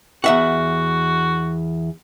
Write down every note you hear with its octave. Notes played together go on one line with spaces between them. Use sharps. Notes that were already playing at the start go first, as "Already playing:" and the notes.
E2 F#4 E5 F#5